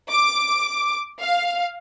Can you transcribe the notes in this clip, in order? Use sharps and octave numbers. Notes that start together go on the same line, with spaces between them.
D6
F5